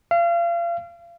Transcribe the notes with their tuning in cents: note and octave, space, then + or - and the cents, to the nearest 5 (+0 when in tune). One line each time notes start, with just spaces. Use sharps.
F5 -35